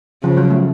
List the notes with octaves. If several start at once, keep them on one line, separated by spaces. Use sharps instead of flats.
C#3 F3
F#3
A3